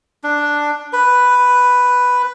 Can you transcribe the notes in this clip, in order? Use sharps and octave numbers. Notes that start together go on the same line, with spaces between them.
D4
B4